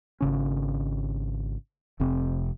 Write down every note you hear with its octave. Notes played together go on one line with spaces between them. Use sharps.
G#1 C#3 C#4
F1 C3 C4